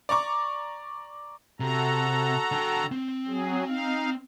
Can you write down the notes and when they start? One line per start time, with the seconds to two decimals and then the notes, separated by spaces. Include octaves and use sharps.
0.09 D5 A#5 C#6 D6
1.60 C3 F#4 A4 A#5
2.52 D3 G5
2.92 C4
3.27 F#3 G#4
3.68 D#4 F5